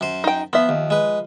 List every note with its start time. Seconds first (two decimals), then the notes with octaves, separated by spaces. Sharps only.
0.01 F#2 C5
0.24 D#4 G5
0.53 F3 B3 E5
0.69 D#2
0.90 G#3 B4